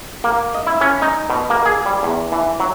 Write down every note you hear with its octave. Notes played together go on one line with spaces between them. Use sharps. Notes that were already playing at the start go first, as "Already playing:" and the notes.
A#3
D#5
E4
C#4
D#4
B2
A#3
G#4
G3
E2
E3
F#3